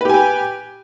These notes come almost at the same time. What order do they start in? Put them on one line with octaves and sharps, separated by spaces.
B4 G4 G#5 G5